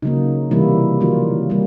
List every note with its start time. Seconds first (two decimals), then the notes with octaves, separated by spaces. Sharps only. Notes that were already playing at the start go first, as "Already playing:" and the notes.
0.02 C#3 F#3 A#3 D#4
0.51 C3 E3 G3 A#3 E4
1.00 D#3 F#3 A#3 F4
1.50 G3 A#3